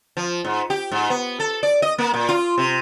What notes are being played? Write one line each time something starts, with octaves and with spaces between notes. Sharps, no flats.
F3
G#2
G4
G#2
B3
A4
D5
D#5
A#3
A#2
F4
C3